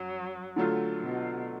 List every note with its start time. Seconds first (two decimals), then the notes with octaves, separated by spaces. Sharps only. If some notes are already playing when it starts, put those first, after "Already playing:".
Already playing: F#2 F#3
0.56 D3 F#3 A3 F4
1.01 B2